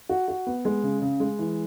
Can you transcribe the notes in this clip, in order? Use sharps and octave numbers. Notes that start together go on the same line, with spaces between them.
F#4
F#4
B3
G#3
C#3
C#3
G#3
E3